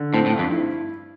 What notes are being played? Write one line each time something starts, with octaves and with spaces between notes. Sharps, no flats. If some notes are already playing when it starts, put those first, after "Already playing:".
Already playing: D3
A2 C4
A2
G2
F2
E4